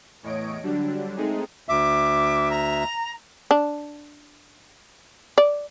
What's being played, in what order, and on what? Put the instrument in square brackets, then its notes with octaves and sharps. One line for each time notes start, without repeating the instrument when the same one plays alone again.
[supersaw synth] E2 A2 C#5 D#5 D7
D3 F#3 G3 D4
G#3 A3 C4 D#4 G#4
[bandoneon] D2 E5 [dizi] D6
[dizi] A#5
[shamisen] D4
D5